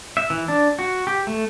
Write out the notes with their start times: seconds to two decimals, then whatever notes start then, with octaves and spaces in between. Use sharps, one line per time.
0.17 E5
0.30 E3
0.48 D4
0.79 F#4
1.07 G4
1.27 A3